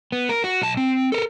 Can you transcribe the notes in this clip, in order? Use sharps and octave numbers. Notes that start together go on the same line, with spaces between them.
B3
A#4
F#4
B1 A5
C4
A4 A#4